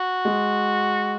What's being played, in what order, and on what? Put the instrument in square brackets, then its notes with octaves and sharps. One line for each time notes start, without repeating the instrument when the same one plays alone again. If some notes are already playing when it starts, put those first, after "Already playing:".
Already playing: [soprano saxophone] F#4
[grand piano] G#3